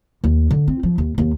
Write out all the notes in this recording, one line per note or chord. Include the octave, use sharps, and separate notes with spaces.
D#2
D3
C4
F3
D#2
D#2